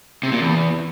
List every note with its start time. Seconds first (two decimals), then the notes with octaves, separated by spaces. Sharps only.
0.23 C3
0.32 A#2
0.40 E2